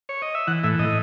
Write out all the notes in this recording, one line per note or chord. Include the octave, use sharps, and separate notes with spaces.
C#5
D#5
E5
E3 F#5
A2 E5
A2 D#5